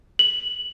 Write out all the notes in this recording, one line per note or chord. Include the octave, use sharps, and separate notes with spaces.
F#7